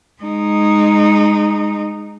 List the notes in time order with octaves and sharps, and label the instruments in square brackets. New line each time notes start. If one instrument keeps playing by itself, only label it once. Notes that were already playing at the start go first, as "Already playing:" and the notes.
[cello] G#3 D#4